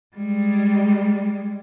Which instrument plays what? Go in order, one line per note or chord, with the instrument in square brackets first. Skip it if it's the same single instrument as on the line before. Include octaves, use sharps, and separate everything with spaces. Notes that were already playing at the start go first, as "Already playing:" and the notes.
[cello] G3 G#3